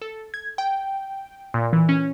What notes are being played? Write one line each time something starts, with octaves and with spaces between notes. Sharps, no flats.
A4
G#6
G5
A#2
E3
C#4